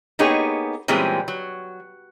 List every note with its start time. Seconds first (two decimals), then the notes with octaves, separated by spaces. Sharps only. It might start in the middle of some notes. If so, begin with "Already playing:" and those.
0.19 A#3 B3 D#4 G4 G#4 C#5
0.88 A#2 E3 G3 G#3 C4 C#4
1.28 F#3